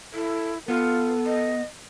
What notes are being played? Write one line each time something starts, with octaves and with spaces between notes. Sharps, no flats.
E4 A4
B3 F4 A4
D#5